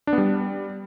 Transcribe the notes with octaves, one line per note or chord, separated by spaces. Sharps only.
D4
B3
G3